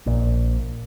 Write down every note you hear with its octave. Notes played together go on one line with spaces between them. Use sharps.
A#1 A#2